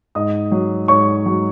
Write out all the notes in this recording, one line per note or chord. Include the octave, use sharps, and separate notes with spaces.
G#2 D#5 D#6
F#3
G#2 C#5 C#6
F#3